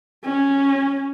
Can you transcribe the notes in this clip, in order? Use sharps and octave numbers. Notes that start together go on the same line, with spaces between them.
C#4